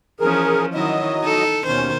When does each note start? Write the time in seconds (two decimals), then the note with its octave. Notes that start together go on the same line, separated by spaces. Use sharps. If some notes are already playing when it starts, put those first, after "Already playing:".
0.20 E3 F3 C#4 G#4 A#4
0.74 D#3 F#3 E4 D#5
1.20 D#4 A4
1.66 D#2 B2 D#3 C#4 C5